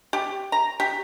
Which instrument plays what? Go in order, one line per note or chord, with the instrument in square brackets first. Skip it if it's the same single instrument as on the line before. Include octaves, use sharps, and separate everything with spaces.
[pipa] G4
A#5
G4